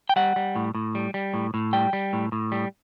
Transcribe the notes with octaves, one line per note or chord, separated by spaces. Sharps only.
G5
G3 F#5
G3
A2
A2
G3
G3
A2
A2
G3 G5
G3
A2
A2
G3